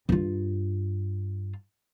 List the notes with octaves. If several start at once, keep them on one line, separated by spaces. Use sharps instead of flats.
G2 F4